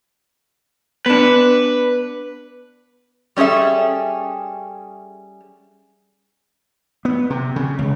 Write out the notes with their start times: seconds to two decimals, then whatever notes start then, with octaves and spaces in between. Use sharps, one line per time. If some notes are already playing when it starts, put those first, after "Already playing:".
1.06 B3 D4 B4
3.36 G3 C#4 G#4 A4 E5
7.05 B3
7.30 C3
7.56 C#3
7.79 C#2